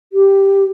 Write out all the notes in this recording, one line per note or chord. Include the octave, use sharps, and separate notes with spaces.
G4